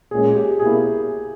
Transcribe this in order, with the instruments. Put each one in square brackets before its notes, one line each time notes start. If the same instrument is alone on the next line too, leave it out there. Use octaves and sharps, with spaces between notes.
[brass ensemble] A#2 G#3 C#4 [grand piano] G#4
[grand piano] G4
[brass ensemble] B2 A#3 C#4 E4 [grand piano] G#4